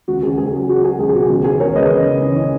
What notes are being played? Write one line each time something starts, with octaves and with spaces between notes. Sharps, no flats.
C#2 F#4
C#2 G#4
C#2 G#4
F#3 G#4
F#3 F#4
F#3 G#4
C#2 G#4
G#4
B2 F#4
C#2 G#4
E3 G#4
C#2 A#4 C#5
C#2 B4 D#5
C#2
C#3
E3
E3